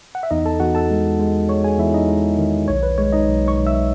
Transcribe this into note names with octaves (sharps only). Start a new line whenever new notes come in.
F#5
E5
E2 D#4 D#5
A4 A5
E2 F#4 F#5
A4 A5
G#3
G#3
G#3 C#5 C#6
G#4 G#5
E2 E4 E5
D#4 D#5
G#3
D#3
B1 C#5
B4
G#3 C#5
D#4 D#5
B1
C#5 C#6
B1
E5 E6